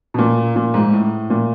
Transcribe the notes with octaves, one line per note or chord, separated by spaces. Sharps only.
B2
A#2
A#2
G#2
A2
A#2